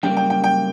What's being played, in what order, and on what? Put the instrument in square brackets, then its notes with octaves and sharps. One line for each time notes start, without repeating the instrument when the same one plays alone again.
[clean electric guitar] F#2 C#3 G3 A#3 [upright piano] G5
[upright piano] G5
G5
G5